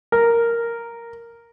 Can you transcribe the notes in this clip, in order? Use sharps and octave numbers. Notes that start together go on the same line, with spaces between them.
A#4